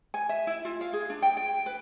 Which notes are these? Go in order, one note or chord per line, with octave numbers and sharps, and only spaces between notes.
G#5
E5
E4
F4
F5
G#4
D4
G5
G5
B4